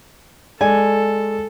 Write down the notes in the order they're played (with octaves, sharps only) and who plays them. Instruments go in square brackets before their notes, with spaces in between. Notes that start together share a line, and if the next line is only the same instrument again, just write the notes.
[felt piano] G#3 D5 [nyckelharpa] A4 [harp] G#5